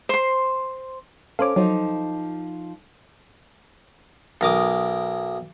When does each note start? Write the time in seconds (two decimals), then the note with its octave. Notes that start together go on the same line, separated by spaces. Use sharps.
0.09 C5 C6
1.39 C#4 A4 C5 C#5 F5 D6
1.56 F3 F#3 D#4 F4
4.41 B1 A#4 D6 D#6